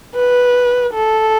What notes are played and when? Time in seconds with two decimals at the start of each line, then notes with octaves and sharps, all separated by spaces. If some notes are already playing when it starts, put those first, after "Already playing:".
0.15 B4
0.94 A4